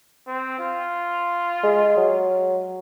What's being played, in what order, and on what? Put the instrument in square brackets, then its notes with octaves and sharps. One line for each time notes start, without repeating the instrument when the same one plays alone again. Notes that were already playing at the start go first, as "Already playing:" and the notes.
[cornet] C4
F4
[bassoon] G#3
F#3